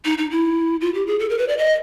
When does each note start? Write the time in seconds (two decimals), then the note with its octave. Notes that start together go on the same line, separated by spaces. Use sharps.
0.05 D#4
0.18 D#4
0.31 E4
0.81 F4
0.94 G4
1.07 G#4
1.19 A4
1.30 A#4
1.38 B4
1.48 D5
1.58 D#5